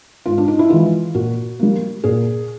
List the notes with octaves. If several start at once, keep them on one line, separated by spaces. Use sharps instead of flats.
G#2 F4
D4
D#4
E4
E3 G#3 F4
A#2 F#4
G3 A#3
A#2 G#4